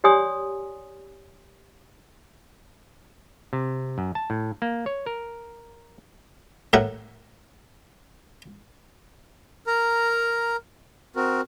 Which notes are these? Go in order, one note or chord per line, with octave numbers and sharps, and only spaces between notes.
G4 C#5 D5 G#5 C6 D#6
C3
F#2
A5
A2
A#3
C#5
A#4
A2 A#4 F#5
A#4 A#5
C4 F#4 A#4